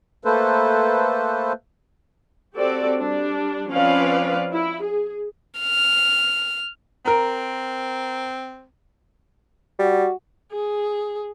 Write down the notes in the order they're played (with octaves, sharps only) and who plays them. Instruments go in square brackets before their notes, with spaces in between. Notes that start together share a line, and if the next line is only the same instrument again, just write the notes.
[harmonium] A3 A#3 A4 B4 C5
[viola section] C4 F#4 G4 A4 D5
G3 D4
F3 C4 C#4 B4 D5 F5
E4
G#4
[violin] F6
[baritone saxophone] C4 [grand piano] A#4 A#5
[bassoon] G3 [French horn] F#4
[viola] G#4